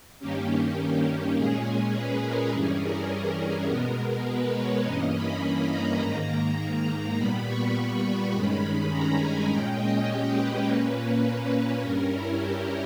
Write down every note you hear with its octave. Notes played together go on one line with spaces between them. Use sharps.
G2 D#3 A#3 C#4 G4
A#2 G#3 C#4 G#4
B4
A#4
G2 E3 G3 C#4 G#4
A#4
B2 G#3 B3
B4
C#5
G2 E3 A#3 C#4 D#5
B5
B5
A#5
G#2 D#3 A#3
A#2 G3 B3 B5
C#6
B5
G2 D#3 G#3 C#4
A#5
G#5
A#2 G#3 C#4 G5
D#5
G4
B4
A#2 A#3 C#4
B4
G2 G3 C#4 A#4
E4
G4